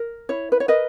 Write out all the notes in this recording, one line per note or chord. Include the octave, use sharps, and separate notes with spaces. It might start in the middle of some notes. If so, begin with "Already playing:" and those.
Already playing: A#4
E4 C#5
B4
C#5
A#4 B4 D#5